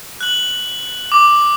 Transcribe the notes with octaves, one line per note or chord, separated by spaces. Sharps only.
F#6 F#7
D6